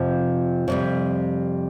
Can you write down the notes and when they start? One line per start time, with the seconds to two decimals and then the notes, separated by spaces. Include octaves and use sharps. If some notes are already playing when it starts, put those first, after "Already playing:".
Already playing: F2 C3 F3
0.68 F2 C3 G3